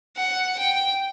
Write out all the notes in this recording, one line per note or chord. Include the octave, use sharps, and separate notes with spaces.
F#5
G5